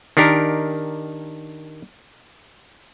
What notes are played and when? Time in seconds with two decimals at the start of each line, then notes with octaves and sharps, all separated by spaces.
0.17 D#3 D4 G4 A#4